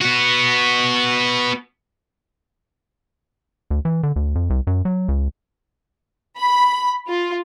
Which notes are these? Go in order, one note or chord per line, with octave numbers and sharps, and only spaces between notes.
B3 F#4
D2
E3
D3
D2
F2
C2
F#2
F#3
C#2
B5
F4